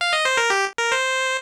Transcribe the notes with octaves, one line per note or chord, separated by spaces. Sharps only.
F5
D#5
C5
A#4
G4
A#4
C5